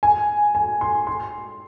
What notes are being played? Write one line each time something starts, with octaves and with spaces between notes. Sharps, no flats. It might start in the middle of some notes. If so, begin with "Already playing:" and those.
G#5
G#5
C6
C6